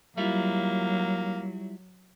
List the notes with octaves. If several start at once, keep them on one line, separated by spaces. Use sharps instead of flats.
F#3 G3 A#3 E4 F4